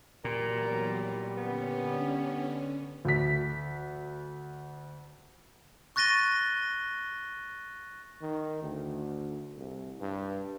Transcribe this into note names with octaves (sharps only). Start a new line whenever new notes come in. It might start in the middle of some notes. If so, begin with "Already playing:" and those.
E2 A#2 F#3 G3 A#4
D3 B3 C#4
D2 B6
C#6 F#6 A6 A#6 D#7 G7
D#3
D2
C2
G2